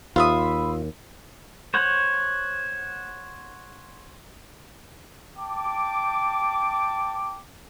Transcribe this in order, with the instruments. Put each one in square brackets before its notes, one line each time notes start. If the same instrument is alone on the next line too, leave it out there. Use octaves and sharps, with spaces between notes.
[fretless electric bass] D#2 [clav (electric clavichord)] F4 [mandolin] C5 E5 D#6 [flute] B5
[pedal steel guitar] C5 C#5 F#5
[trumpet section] G5 A5 D6